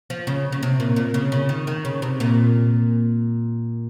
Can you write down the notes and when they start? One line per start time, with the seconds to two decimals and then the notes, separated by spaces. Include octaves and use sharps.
0.10 F3
0.27 C#3
0.52 C#3
0.63 C3
0.80 A#2
0.96 A#2
1.14 C#3
1.32 C#3
1.49 D#3
1.67 D#3
1.85 C#3
2.02 C3
2.20 A#2